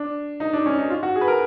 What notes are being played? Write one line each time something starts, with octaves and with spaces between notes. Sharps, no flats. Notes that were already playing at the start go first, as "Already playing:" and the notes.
Already playing: D4
D#4
D4
C#4
D#4
F4
F#4
G#4
B4
A#4